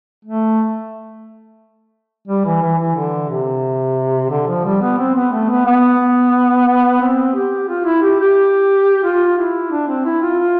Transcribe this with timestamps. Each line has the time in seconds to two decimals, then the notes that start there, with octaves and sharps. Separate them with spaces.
0.25 A3
2.28 G3
2.45 E3
2.62 E3
2.78 E3
2.95 D3
3.29 C3
4.30 D3
4.47 F3
4.65 G3
4.81 B3
4.98 C4
5.15 B3
5.32 A3
5.49 B3
5.65 B3
7.01 C4
7.35 G4
7.68 F4
7.85 E4
8.02 G4
8.19 G4
9.03 F4
9.37 E4
9.71 D4
9.88 C4
10.05 E4
10.22 F4
10.39 F4